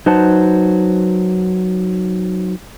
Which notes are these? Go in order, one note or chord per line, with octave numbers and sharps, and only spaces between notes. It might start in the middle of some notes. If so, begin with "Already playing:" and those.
F#3 D#4 B4 C5 F#5 A5